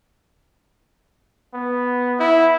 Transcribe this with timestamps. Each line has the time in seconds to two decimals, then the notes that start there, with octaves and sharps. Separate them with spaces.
1.54 B3
2.20 E4